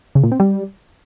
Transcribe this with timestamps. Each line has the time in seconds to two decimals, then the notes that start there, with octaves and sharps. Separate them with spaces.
0.15 C#3
0.23 A#2
0.32 C4
0.40 G3